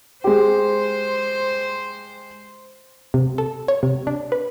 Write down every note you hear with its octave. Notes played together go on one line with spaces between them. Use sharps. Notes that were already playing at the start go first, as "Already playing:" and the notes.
G#3 G4 C5
C3
A4
C#5
C3
D4
B4